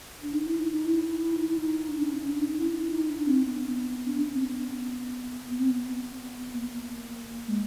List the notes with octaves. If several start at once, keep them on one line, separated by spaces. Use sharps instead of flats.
D4
D#4
E4
D#4
D#4
E4
D#4
E4
D#4
D4
C#4
C#4
D4
D#4
D#4
E4
E4
D#4
D4
C4
B3
D4
C#4
C4
B3
B3
C4
B3
A#3
G#3